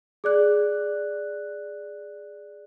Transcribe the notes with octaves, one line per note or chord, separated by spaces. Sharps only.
G#4 D5 F#6